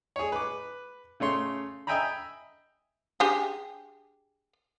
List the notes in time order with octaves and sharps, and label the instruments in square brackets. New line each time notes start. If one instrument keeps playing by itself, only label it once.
[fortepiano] G#4 C#5
B4 D6
C#3 A3 C#5 C6
D#5 E5 G5 G#5 A#5 B5
[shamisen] D4 G4 G#4